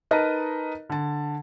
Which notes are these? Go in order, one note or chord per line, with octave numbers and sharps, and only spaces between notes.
D#4 A#4 B4 D#5 A5 A#5
D3 A5